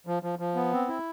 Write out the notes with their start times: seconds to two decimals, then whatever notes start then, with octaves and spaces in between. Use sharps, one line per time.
0.07 F3
0.23 F3
0.39 F3
0.55 B3
0.73 C4
0.88 E4